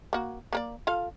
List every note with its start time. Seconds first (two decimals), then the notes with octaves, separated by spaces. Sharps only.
0.13 A#3 F#4
0.53 A#3 A#4 D5
0.87 F4 A4 F5